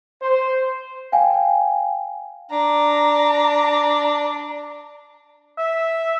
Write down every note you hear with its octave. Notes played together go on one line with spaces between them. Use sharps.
C5
F5 G5 G#5
D4 A#5
E5